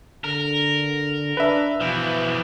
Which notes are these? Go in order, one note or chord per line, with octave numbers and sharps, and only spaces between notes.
D3 A#4
D4 B4 E5
B2 E3 F3